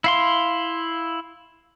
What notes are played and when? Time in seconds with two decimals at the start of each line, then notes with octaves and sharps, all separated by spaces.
0.04 E4 F5 C6